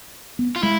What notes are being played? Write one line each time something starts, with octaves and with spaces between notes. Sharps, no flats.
B3
F4
G#3 E4